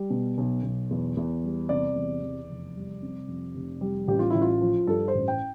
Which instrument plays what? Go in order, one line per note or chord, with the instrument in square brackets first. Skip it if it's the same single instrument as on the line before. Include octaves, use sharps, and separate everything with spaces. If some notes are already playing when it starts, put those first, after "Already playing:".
Already playing: [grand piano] G3
B2
B1
B1
E2
E2
G3
C3 D5
E2
E2
F1
G3
C3
F2
F1
G3
A1 G4
F4
A1 E4
F4
F3
G2 A4
C5
A1
G5